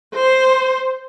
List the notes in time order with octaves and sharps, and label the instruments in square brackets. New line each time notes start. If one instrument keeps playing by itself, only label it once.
[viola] C5